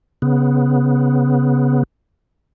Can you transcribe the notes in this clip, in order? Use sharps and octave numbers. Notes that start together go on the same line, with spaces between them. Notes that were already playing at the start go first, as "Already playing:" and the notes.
C#3 B3